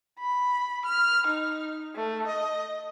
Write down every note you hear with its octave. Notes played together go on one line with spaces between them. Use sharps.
B5
F6
D#4
A3
D#5